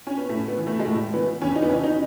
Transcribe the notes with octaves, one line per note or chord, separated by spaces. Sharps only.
C#4
B3
A2 A3
B3
E3
A3
G#3
A2 A3
E3 B3
E2 C#4
D#4
B3
C#3 E3 C#4
D#4